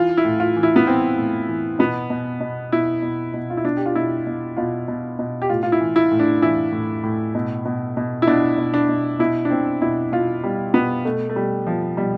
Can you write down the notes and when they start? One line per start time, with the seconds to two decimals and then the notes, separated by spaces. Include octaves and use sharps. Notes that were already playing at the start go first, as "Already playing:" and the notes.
Already playing: E3 F4
0.17 E4
0.25 A2
0.40 F4
0.57 E3
0.63 E4
0.76 B3
0.87 E3 C4
1.17 A2
1.48 E3
1.79 B2 B3
2.10 B2
2.41 B2
2.72 B2 E4
3.02 B2
3.34 B2
3.50 F4
3.57 E4
3.64 B2 D4
3.77 G4
3.86 F4
3.95 B2 E4
4.27 B2
4.57 B2 F4
4.88 B2
5.19 B2
5.42 G4
5.49 A2 F4
5.63 F4
5.72 E4
5.81 E3
5.96 E4
6.11 A2
6.20 D4
6.42 E3 E4
6.73 A2
7.04 A2
7.35 B2
7.65 B2
7.97 B2
8.22 E4
8.27 B2 D4
8.58 B2
8.74 D4
8.89 B2
9.19 B2 E4
9.45 D4
9.50 B2 C4
9.82 B2 E4
10.12 B2 F4
10.43 B2 G3
10.74 B2 B3
11.05 B2 A3
11.29 A3
11.36 B2 G3
11.67 B2 F3
11.97 B2 G3